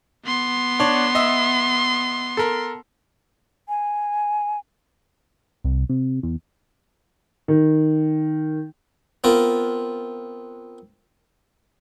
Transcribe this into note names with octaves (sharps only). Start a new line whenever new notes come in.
B3 C6
D4 C#5
D#5 E5
A4 A#4
G#5
C2
C3
E2
D#3
B3 C4 F4 A#4